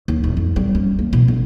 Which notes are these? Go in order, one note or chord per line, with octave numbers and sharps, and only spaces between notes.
D#2
D#1
F2
G3
C#4
A#3
B2
G1